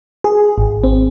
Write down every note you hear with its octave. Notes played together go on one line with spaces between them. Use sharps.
G#4
G#1
C4